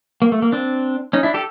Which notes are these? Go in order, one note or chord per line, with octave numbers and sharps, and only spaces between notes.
A#3
A3
A#3
C4 D4
C#4 D#4
D4 E4
G4 A4